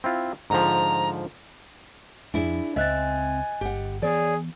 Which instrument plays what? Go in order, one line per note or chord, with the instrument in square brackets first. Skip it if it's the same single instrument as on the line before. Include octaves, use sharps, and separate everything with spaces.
[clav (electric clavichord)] C4 E4 F4
[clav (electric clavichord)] G#2 D3 F3 [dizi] A#5
[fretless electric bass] F2 [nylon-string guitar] D4 E4 G#4
[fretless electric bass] C#2 [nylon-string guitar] C4 E5 [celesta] D#5 F#6 A6 [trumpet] G#5
[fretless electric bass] G1 [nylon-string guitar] G4 F#5
[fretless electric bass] E3 B3 [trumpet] G#4 [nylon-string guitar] C#5 D5